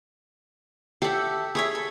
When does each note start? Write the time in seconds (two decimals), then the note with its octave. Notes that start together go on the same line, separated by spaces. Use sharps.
1.02 G4 A4 E5 F#5
1.55 E4 G#4 C#5 E5
1.75 A4